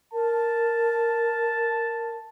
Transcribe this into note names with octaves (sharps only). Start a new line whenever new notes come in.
A#4 A5